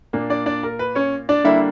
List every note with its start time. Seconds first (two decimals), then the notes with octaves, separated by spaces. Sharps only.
0.13 A#2 A#3 D4
0.30 D4 D5
0.46 D4 D5
0.63 A#4
0.79 B4
0.95 C#4 C#5
1.29 D4 D5
1.44 D3 G3 A#3 D4 E4 E5